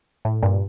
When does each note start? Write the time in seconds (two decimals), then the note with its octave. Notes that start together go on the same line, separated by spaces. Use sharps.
0.25 A2
0.43 G2 A#2